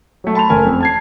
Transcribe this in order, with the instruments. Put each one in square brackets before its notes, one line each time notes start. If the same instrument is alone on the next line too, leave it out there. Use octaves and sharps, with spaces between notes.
[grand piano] F#3 A3
A5 B5 C6 F7
F#1 A3 A#4 G#5
F2
A5 G#6 C7